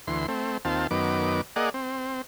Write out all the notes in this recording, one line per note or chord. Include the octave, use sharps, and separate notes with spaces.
D2 E3 C6
A3 C4
D#2 C4 F4 A5
F#2 D#3 B3 D6
A#3 G#4 D5 D#5 F#5
C4